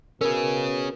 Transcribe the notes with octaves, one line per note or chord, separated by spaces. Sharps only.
B2 C#4 G#4 A#4